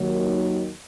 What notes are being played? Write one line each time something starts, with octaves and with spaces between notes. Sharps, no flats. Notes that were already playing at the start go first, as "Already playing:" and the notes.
Already playing: D#2 D#3 F#3